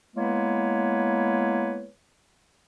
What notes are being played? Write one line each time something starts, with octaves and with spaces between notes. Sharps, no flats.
G#3 A#3 B3 E4 B4 C#5